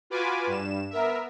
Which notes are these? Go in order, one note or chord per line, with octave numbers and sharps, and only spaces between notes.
F4 F#4 B4 G#5 D6
G2 E7
B3 A#4 E5